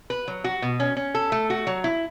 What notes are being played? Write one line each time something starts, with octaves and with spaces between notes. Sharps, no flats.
B4
F#3
F#4
B2
C#4
C#4
A4
A3
F#4
F#3
E4